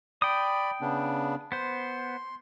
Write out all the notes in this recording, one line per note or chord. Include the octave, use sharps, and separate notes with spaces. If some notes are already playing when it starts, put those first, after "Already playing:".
D5 G5 B5 D#6
C#3 B3 D4
B3 C5 C6